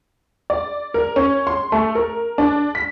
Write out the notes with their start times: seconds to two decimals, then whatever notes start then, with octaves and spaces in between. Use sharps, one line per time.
0.50 D5
0.94 A#4
1.16 C#4
1.47 C6
1.72 A3
1.95 A#4
2.38 D4
2.75 B6